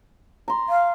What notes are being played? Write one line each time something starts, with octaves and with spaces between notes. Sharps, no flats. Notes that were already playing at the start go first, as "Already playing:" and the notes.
A#5 C6
F5